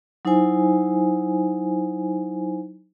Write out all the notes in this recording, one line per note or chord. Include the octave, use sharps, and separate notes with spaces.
F#3 D#4 E4 C5 G#5